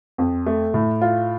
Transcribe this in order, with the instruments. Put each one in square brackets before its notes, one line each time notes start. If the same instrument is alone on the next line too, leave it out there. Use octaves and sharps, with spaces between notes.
[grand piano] F2
A3
A2
F4